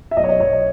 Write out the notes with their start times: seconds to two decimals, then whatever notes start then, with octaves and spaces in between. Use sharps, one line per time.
0.11 E5
0.17 B1 D#5
0.24 C#5
0.29 D#5
0.40 B1 C#5
0.53 D#5